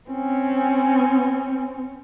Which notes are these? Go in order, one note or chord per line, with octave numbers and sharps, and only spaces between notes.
C4 C#4